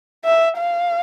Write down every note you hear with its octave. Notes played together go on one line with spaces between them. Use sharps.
E5
F5